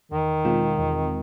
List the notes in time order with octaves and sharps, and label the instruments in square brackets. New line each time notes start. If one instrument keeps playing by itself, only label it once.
[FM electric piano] E2 [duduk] D#3
[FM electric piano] B2 G#3 C4 F4
E2